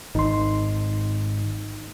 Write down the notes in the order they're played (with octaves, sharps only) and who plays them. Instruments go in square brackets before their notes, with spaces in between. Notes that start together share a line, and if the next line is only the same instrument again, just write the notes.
[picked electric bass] G#1 [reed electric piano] D#4 C6